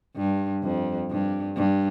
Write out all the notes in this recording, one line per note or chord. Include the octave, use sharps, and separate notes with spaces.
G2
F2
G2
G2